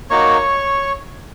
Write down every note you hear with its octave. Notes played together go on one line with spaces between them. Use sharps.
A#3 D#4 F#4 C#5 C#6